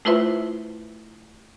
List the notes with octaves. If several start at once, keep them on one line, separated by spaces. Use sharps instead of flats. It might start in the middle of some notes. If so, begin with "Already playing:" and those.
A3 E4 F4 B4 C5 E5